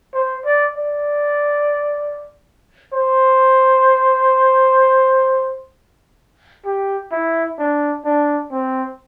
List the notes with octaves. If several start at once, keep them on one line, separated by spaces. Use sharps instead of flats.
C5
D5
D5
C5
G4
E4
D4
D4
C4